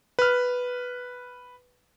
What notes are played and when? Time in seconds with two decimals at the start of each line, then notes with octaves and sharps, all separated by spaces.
0.19 B4 F6